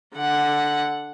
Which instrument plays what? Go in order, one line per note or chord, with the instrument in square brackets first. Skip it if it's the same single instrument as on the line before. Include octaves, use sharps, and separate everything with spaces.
[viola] D3 F#5